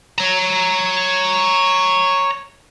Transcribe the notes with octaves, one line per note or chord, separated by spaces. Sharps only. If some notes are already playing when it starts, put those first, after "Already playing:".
C#5 A#5